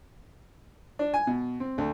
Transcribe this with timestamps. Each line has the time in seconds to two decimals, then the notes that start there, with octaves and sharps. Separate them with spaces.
0.99 D4
1.14 G#5
1.27 B2
1.60 C4
1.78 D2